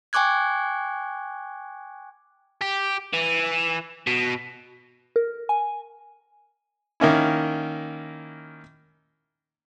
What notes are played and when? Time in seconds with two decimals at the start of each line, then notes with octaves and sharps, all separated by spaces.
0.13 G5 G#5 C#6 D6 F#6 G#6
2.61 G4
3.13 E3
4.07 B2
5.16 A#4
5.49 G#5
7.00 D#3 A#3 C#4 E4